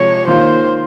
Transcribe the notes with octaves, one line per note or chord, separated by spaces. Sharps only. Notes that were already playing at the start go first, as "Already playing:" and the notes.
Already playing: C3 F3 G#3 C#5
D#3 A#3 F4 A#4 C5